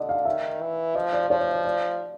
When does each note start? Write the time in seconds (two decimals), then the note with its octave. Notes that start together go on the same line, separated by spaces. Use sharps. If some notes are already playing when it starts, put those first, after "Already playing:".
Already playing: D3 D5 D#5
0.09 F5
0.25 D#3 E5
0.61 E3
0.95 F3 D#5
1.13 D5
1.30 F3 C#5
1.41 D5
1.53 D5
1.65 D5